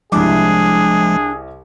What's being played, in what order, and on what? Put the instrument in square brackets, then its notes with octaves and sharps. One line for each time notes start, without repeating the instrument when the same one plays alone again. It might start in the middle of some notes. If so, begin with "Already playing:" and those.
[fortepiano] C2 E4 D6 [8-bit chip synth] F3 G#3 [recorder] D4 [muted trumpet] G#4